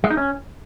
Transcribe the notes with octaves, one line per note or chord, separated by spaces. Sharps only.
G#3
D#4
C#4